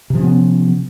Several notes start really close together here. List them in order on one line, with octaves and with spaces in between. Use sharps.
C3 F3 C#4 B3